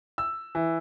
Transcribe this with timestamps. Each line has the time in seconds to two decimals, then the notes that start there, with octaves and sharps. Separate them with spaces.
0.18 E6
0.55 E3